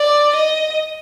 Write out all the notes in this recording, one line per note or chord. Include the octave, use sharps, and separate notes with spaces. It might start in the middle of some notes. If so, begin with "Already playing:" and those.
Already playing: D5
D#5